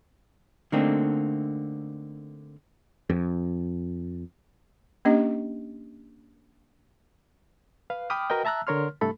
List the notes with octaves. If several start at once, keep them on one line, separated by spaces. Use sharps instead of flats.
D3 A3 A#3 C4 D4 D#4
F2
A#3 C#4 D4 G4 D#5
B4 F5
G5 B5 D6 D#6 F6
F#4 A#4 B4 D#5 G5
E5 A5 A#5 E6 F#6
D3 A#4 C#5 C6 F6
C2 G2 A3 A4 B5